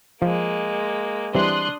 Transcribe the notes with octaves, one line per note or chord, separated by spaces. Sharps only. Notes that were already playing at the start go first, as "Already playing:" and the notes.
F3 G#3 A#3
E3 G3 C4 D4 C6 D#6 F#6